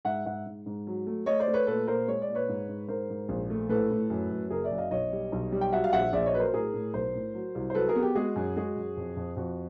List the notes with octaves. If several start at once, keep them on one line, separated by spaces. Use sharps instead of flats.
G#2 E5 F#5
G#2 E5 F#5
G#2
G#2
F#3
A3
A3 C#5 D#5
C5 D5
A3
B4 C#5
A#2 A4 B4
A#2 A#4 C5
G#3 C#5
D5
A#2
B4 C#5
G#2
G#2
G#2 A#4 C5
G#2
A#1
A3
A2 A4 B4
A2
F#2
F#2
F#1 G#4 A#4
D5 E5
F#2
D#5 F5
B1 C#5 D#5
G3
B1
G3
G5
F#3 E5 F#5
F5
A#1 E5 F#5
A#1 D5 E5
C#5 D#5
F#3 B4
A#4 C5
A2 G#4 A#4
A2
B1 A#4 C5
A2
F#3
C2
C5
F#3 A4 B4
G#4 A#4
B3
G4
G#3 F#4 G#4
F#2
G#3 F#4 G#4
F#2
F2
F2
F2 F#4